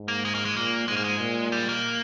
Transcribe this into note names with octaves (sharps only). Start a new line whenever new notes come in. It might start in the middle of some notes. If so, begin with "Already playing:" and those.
Already playing: G#2
A#3
G#3
A#3
G#3
A#2 A#3
G#2 G#3
A#3
G#3
A#2
G3
A#3